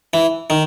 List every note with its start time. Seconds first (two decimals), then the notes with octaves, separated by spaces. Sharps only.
0.14 E3
0.50 D#3